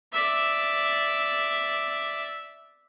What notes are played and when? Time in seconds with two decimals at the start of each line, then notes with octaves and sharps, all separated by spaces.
0.12 D5 E5